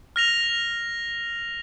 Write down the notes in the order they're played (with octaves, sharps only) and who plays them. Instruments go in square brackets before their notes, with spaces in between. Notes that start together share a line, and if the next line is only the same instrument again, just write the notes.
[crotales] F6 A#6 F7